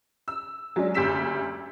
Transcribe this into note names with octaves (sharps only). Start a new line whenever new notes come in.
E6
F#3 G#3 C#4 D4
F#1 D2 G4 E6 B6 E7